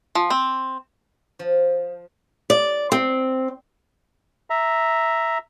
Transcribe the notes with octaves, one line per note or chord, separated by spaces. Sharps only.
F3
C4
F3
D5
C4
E5 A#5